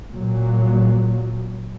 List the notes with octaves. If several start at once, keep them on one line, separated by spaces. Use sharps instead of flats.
A#2 F#3